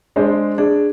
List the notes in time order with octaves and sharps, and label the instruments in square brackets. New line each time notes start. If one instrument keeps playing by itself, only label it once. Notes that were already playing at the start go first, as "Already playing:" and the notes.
[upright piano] G#3 D4 C5
[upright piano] D4 [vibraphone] G#4